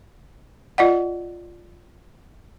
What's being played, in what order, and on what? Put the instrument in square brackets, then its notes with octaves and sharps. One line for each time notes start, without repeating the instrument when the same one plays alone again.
[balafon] F4 D5 D#5 F#5